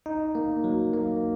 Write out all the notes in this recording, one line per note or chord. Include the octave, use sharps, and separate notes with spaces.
D#4
A#3
F#3
A#3